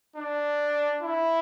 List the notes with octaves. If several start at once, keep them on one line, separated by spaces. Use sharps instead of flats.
D4
E4